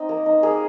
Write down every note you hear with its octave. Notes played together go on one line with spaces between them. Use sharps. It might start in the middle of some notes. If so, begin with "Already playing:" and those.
Already playing: C4 D#4 D#5
A#3
D#4
A#3 G#4